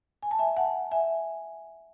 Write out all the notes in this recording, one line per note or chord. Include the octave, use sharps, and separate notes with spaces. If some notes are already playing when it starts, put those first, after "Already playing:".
G#5
A5
E5 G#5
F#5 A5
E5 G#5